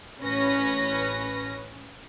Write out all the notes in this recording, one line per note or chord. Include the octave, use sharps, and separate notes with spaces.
A1 C#4 B4 A#6